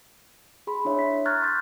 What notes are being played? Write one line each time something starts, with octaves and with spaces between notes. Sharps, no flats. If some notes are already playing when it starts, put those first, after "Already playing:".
G#4 B5 C6
D4 E4 C#5 E5
B6
A#5 C#6 F6 F#6 G#6 A6
C6 C#6 D#6 G6 A6